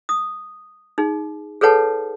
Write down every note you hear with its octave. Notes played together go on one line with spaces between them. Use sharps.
D#6
D#4 G#4
G#4 A4 B4 C#5 F#5 A5